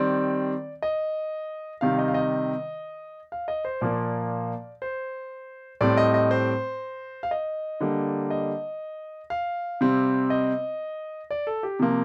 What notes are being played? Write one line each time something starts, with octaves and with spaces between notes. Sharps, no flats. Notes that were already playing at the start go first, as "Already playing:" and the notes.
Already playing: D#3 G3 C4 D5
D#5
C3 D#3 G3 F5
D#5
F5
D#5
F5
D#5
C5
A#2 F3 A#3 D5
C5
A2 G3 C4 D5
D#5
D#5
C5
F5
D#5
D3 G3 A#3
D#5
F5
C3 G3 C4
D#5
D5
A4
G4
C3 F3 A#3